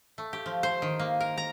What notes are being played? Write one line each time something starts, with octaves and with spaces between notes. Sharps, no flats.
A3
G4
F3
C5
D#3
A#3
A#4
A#5